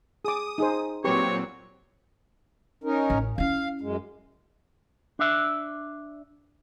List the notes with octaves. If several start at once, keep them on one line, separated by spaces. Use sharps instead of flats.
G#4 D6 D#6
D#4 G#4 C5
A#2 F#3 C4 G4 B4 C#5 C#6
C#4 D#4 A#4
A1
C#4 E4 F5
F#2 G#3
D4 E5